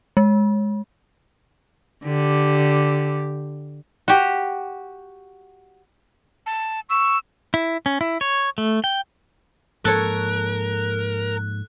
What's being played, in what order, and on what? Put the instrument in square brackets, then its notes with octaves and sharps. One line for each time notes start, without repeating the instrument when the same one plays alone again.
[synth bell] G#3
[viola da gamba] D3 G4
[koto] F#4 G4
[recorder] A5
[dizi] C#6 [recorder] E6
[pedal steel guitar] E4
C#4
E4
C#5
A3
G5
[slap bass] G#2 F3 A#3 [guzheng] A4 C#5 [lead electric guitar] A#4 [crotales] F#6